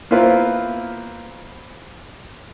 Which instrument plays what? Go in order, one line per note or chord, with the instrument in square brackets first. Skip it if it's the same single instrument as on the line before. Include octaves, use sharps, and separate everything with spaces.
[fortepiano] A#3 B3 E4 F4 B4 C5